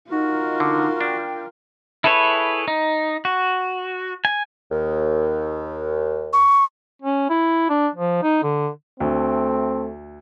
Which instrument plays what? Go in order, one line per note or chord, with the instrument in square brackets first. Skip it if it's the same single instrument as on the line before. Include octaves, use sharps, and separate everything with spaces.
[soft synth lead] D#4 [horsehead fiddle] F4 A#4 [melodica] F#4
[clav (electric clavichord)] D3
[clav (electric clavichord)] D4 [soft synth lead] G5
[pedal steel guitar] E4 G#4 A4 B4 C#5
D#4
F#4
G#5
[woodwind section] D#2
[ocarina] C#6
[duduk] C#4
E4
D4
F3
D#4
D3
[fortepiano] D2 [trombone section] A3 C4